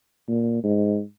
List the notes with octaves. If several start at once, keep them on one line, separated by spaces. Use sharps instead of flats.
A#2
G#2